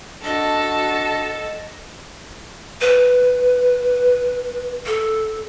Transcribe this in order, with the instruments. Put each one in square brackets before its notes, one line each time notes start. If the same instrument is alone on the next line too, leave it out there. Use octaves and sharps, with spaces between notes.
[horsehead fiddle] D4 F#4 [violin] A4 [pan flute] D#5
[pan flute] B4
A4